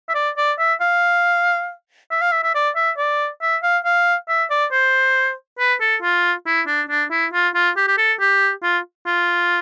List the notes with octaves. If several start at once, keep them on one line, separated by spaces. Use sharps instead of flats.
E5
D5
D5
E5
F5
E5
F5
E5
E5
D5
E5
D5
E5
F5
F5
E5
D5
C5
B4
A4
F4
E4
D4
D4
E4
F4
F4
G4
G4
A4
G4
F4
F4